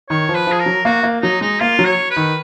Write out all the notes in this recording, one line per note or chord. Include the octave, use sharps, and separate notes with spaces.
D#3 C#5
F3
B4
F3 G#4
A#4
F#3
A#3 F#4
A#3
F#3 D#4
G#3 D#4
A#3 F4
F#3
C#5
B4
D#3